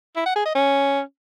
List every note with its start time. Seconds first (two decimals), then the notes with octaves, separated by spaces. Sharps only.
0.16 E4
0.26 F#5
0.36 G#4
0.45 D#5
0.55 C#4